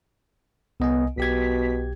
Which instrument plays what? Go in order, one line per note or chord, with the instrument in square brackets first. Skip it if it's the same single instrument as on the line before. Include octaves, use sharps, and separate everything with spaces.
[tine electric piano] C2 D#5 G#5 [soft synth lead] B3
[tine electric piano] B1 G4 G#6 [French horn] B2 [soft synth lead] B6